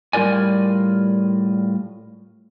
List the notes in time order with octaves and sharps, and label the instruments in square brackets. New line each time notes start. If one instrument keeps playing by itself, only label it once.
[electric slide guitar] A2 G3 F4 A#4 D5 G#5